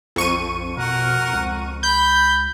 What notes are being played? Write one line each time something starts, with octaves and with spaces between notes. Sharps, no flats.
A#1 F2 C#6 D#7
B2 A#4 F#5 F6
C#2
B5 G6